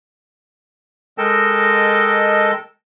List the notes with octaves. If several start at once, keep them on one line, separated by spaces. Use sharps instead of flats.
G#3 A4 A#4 D#5 G5 A5